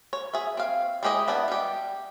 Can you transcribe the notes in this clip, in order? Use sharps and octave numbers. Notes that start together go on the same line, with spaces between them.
C#5
G#4 E5
C4 F5
G#3 E4 G4 G#4 D#5
B3 D4 D#5 E5
G3 G4